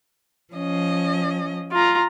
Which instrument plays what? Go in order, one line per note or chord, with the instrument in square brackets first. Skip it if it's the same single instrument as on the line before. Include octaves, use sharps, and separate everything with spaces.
[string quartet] F3 C#4 D#5
[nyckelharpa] F4 A#5